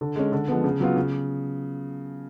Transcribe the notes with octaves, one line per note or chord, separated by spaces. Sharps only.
D3
G#3 C#4
D3
F3 G#3 B3
C#3
F#3 B3 F4
C#3